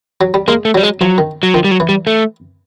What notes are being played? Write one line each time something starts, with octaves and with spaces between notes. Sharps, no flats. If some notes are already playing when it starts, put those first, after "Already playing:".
F#3
G3
G#3 A#3
A3
F#3 G3
G#3
F3 F#3
D#3
F#3
D#3 F3
G3
F#3
E3
G3
A3